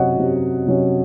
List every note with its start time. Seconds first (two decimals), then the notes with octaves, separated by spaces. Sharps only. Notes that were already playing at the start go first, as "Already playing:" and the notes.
Already playing: C3 F#3 C#4 C#5 D#5 F#5
0.17 C3 F#3 C#4
0.66 C3 F#3 C#4